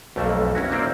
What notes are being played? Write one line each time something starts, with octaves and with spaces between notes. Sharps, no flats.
B1 F2 A3 A#3 A5
C#4 E4 F#4
A#3 C4 E4 C5 D5